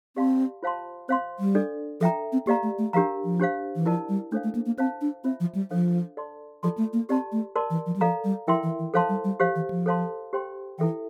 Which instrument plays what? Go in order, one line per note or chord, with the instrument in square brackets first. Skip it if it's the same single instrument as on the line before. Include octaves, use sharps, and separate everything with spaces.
[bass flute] C4 [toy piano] G4 D5 F5 A5 C6
[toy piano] F4 C5 F5 A5 C6
[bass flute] C4 [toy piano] C5 F5 C6
[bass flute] G3
[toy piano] D4 A4 D5
[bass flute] F3 [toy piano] A4 E5 G5 A#5
[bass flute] C4
[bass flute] A#3 [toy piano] G4 D5 F5 A#5
[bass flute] A3
A3
[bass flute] F3 [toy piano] D4 G4 A#4 F5 A#5
[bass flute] F3
[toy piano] D4 G4 C5 F5
[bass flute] E3
[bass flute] F3 [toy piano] E4 A#4 D5 A5
[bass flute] G3
[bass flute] A3 [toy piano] D4 A4 C5 F5
[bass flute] A3
A#3
A#3
[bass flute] C4 [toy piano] C5 F5 A5
[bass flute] D4
[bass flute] C4 [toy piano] F4 C5 E5
[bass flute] F3
G3
[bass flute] F3 [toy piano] D4 A4 C5 F5
[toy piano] A4 D5 A5 C6
[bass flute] F3 [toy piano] F4 A4 D5 A5 C6
[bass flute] A3
A#3
[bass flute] C4 [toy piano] G4 D5 A5 C6
[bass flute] A3
[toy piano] A#4 D5 A5 C6
[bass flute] E3
F3
G3
[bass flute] F3 [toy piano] A4 D5 F5 A#5
[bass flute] G3
[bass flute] F3 [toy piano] E4 A#4 E5 G5 C6
[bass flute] E3
E3
[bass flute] F3 [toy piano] A4 C5 F5 A5 C6
[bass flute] G3
G3
[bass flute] F3 [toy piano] G4 C5 F5
[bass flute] E3
F3
[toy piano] A4 C5 F5 A5 C6
G4 C5 G5 C6
[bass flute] E3 [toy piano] E4 A4 E5 G5